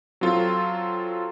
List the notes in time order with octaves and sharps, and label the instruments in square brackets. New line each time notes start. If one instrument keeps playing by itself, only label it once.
[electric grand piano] F#3 C4 F4 A4